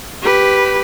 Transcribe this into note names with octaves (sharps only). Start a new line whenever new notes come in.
G4 B4